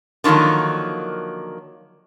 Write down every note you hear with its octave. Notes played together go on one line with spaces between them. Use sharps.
D3 D#3 F3 F#3 A#3